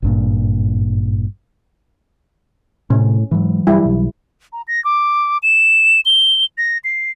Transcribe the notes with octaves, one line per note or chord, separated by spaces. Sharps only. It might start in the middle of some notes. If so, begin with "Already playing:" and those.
G#1 G2 A#2
A2 C3 C#4
G#2 E3 F#3
G2 G3 E4
B1
A#5
A#6
D6
E7
G7
A#6
C7